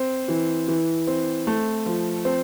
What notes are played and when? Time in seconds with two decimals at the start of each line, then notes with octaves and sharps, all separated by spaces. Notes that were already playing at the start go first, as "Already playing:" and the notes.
Already playing: C4
0.28 E3
0.68 E3
1.07 C4
1.47 A3
1.86 F3
2.25 C4